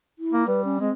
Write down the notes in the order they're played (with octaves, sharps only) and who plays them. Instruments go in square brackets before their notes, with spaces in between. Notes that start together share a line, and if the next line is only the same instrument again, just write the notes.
[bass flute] E4
[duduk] A#3
[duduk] G3 [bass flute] B4
[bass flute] C#4
[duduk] G#3 [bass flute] C4